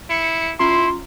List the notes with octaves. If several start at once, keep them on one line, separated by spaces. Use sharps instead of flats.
E4 C#7
C#4 E4 F4 A#5 C6